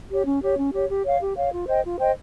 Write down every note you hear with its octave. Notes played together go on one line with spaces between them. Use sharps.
G4 C#5
C#4
G4 C#5
C#4
G4 C#5
G4
C#5 F5
G4
C#5 F5
F4
C5 D#5 G5
F4
C5 D#5 G5